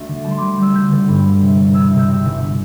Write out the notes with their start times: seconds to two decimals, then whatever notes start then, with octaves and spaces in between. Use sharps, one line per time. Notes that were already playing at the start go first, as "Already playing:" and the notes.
Already playing: D2 A3
0.08 D3
0.24 G3 A5
0.31 C6
0.37 G3 D6
0.58 G3 E6
0.75 D3 G6
0.91 D3
1.08 G2
1.25 G3
1.41 C3
1.58 E1
1.74 E1 E6
1.87 C3 E6
1.99 G6
2.08 C3 E6
2.25 G1